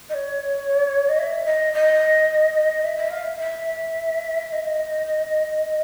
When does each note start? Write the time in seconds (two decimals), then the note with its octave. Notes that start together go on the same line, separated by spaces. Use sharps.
0.09 D#5
0.14 C#5
1.08 D#5
1.18 E5
1.45 D#5
1.73 D#5
2.83 E5
2.96 E5
3.10 F5
3.24 E5
3.38 E5
4.48 E5
4.52 D#5